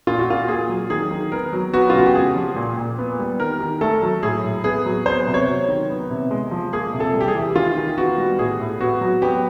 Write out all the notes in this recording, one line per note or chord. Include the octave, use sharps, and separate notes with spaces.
A#2 F4
F#4
A#2 F4
A#3 G#4
F#3
D#3 G#4
D#3
B3 A#4
F#3
B3 F#4
F4
C#3 F#4
G4
G#3 G#4
F3
A#2
A#2
B3
G3
D#3 A#4
D#3
A3 A4
F#3
A2 G#4
A2
B3 G#4
F#3
B3 C5
C3
C#5
F#3
D#3
B3
C3
G#3
F3
A#3 G#4
C3
A4
G3
G4
G#4
E3
D#3 F4
D#3
B3 F#4
G3
A2 G#4
A2
B3 F#4
F#3
B3 G4